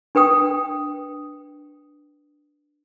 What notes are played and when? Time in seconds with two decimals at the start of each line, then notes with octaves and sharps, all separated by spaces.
0.15 D4 B4 G5 D#6